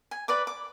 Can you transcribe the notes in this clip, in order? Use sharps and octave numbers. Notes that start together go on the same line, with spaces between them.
G#5
B4 D5 D6
D6